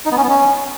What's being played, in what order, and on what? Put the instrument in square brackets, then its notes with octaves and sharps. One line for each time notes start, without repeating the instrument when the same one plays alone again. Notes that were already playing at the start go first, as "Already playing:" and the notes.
[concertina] D#4
B3
C#4
B3
C#4